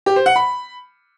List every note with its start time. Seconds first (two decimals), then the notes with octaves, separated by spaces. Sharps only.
0.06 G4
0.16 C5
0.26 F#5
0.36 B5